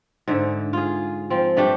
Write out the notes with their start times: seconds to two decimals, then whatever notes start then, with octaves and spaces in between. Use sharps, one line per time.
0.28 G#2 D3 E5
0.73 F4 G#4
1.30 F3 C4
1.57 G2 A3 D4 G4